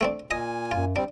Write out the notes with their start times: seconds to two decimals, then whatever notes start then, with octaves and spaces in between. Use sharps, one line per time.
0.01 A3 C4 D4
0.31 A#2 D#5 G#5 D#6
0.71 F#2 F4
0.96 G3 C4 D4